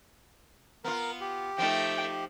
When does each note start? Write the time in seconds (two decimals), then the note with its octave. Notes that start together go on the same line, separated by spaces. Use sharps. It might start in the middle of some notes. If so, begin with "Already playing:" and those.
0.84 B3 F4 A#4
1.21 G4
1.58 F3 A3 D#4 E5 G5